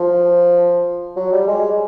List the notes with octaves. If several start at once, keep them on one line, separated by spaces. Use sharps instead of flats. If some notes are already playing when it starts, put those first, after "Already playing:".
Already playing: F3
F#3
G3
G#3